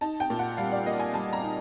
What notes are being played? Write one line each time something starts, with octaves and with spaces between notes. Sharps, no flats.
D#4 A5
G5
A#2
F#5
G3 F5
D5
A#3 D#5
G#5
G3 A5
A#5
D#4